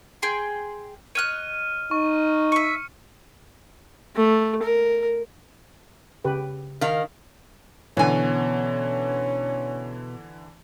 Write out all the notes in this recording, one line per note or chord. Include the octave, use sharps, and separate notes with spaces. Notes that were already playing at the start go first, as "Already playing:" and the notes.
G#4 G5 C6
C#5 D#5 F6 F#6 D#7
D#4 C#6
E5 C#6 C#7
A3
A#4
C#3 G4 B4
D#3 F5
B2 D3 E3 C#4 G#5